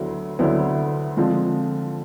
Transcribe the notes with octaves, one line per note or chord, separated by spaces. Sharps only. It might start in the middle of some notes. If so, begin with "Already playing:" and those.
Already playing: D2 D3 F#3 B3 E4
D2 D3 F#3 B3 E4
D3 F3 G#3 C4 F4